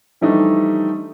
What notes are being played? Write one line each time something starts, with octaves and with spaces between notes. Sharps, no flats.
E3 F3 G3 A3 D4 D#4